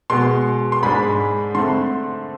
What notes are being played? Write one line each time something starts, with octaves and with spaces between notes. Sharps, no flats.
B2 G#3 B3 C6
C6
G#2 G#3 D4 B5
D3 A3 C4 C6